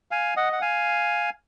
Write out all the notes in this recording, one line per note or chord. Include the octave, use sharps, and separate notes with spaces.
F5 G#5
D#5 F#5
F#5
F5 G#5